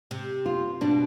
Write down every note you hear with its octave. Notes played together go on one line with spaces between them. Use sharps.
C3
F4
B2 D4